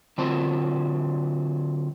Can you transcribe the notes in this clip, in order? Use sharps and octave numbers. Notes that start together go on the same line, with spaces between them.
D3 F#3 C4 F4 C5 A5